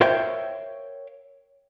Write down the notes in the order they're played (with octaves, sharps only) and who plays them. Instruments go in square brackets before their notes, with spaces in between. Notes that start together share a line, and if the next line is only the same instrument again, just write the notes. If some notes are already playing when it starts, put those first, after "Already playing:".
[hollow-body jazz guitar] A#4 C5 C#5 E5 F5 G5